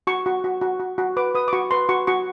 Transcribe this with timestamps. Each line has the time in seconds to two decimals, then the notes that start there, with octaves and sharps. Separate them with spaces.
0.07 F#4 C#6
0.26 F#4
0.44 F#4
0.61 F#4
0.80 F#4
0.98 F#4
1.17 B4 D6
1.35 B4 D#6
1.48 D6
1.53 F#4 C#6
1.71 B4 C6
1.89 F#4 C#6
2.07 F#4 C#6